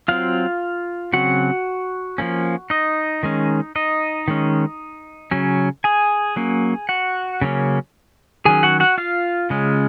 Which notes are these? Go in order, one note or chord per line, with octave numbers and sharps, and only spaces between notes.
F#3 C4 F4 F5
C#3 F#3 C4 F#4 F#5
F3 A#3 C#4
D#4 D#5
D#3 G#3 C#4
D#4 D#5
D#3 G#3 C#4
C#3 F#3 C#4
G#4 G#5
F#3 A#3 C#4
F#4 F#5
C#3 F#3 A#3 C#4
D#3 F#3 C#4 G#4 G#5
F#4 F#5
F#4 F#5
F4 F5
C#3 G#3 C#4